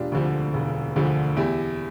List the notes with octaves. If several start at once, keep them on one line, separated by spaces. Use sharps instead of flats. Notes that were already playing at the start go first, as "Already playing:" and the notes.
Already playing: E1 D4 F4 G4
D2 D3 F3
E1
D2 D3 F3
E2 E4 G4